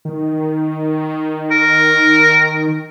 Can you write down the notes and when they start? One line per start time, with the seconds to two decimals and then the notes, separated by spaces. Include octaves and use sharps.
0.05 D#3
1.51 A#4